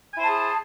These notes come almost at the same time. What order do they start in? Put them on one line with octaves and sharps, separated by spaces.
G#5 E4 C5 A5 G#4